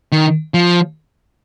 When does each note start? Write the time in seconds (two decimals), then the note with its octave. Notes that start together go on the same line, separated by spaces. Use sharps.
0.12 D#3
0.54 F3